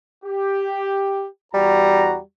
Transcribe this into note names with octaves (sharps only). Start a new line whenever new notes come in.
G4
E2 G3 F#4 A#5